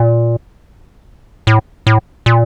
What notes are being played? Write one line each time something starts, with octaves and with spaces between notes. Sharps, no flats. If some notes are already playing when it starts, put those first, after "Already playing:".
Already playing: A#2
A2
A2
A#2